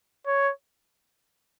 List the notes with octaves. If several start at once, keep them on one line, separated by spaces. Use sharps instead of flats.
C#5